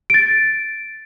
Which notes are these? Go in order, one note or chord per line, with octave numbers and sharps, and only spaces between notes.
A6 D7